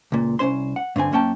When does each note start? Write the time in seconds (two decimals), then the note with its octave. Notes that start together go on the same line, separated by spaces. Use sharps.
0.12 C#2 A#2
0.39 C2 B2 C#4 C5 C6
0.76 F#5
0.96 G2 D3 C4 G#5
1.12 F#2 A#3 C#4 G5 A5